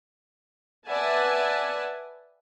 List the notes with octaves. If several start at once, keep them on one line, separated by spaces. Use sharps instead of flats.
B4 D5 E5 F#5 G#5 A5